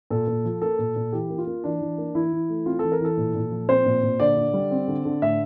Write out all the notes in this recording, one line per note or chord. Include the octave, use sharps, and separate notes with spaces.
A#2 A4
A#2
F3
A#3 A4
A#2
A#2
E3 G4
A#3
F4
A#3
E3 D4
E3
A#3
E3 E4
E3
A3
C4 F4
E3 A4
A#4
E3 A4
A#2
A#2
F3
C4 C5
A#2
A#2
D3 D5
D3
G3
C4
D3
D3
A2 E5